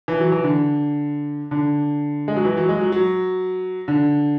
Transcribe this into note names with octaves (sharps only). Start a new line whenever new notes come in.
E3
F#3
E3
D3
D3
G#3
F#3
E3
F#3
G#3
F#3
F#3
D3